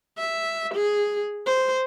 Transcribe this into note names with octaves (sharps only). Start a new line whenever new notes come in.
E5
G#4
C5